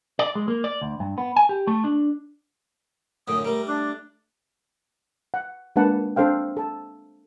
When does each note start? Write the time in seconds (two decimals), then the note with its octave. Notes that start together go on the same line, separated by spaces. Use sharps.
0.19 D5
0.35 G#3
0.48 A#3
0.64 D5
0.82 D2
1.00 G2
1.18 B3
1.36 G#5
1.49 G4
1.67 A3
1.84 D4
3.28 F#2 A2 D3 D#6
3.45 G3 A3 A#4
3.67 D4 D6
5.34 F#5
5.76 G#3 A#3 D4 B4 F#5 A5
6.16 C4 D4 A4 C5 F5 G5
6.57 A4 A5